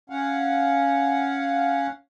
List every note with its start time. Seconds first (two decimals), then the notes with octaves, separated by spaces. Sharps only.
0.10 C#4 F5 F#5